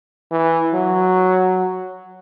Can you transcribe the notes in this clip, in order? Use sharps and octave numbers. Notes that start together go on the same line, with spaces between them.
E3
F#3